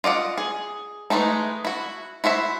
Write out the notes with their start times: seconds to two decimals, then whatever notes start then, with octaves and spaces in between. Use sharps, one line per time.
0.04 F4 D5 D#5 F#5
0.38 G#4
1.10 E3 F3 G#3 A3 D#4
1.65 E4 F#4
2.24 E4 F#4 C5 E5